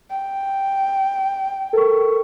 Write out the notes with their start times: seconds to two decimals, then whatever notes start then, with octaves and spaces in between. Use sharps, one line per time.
0.10 G5
1.73 A4 A#4 C#6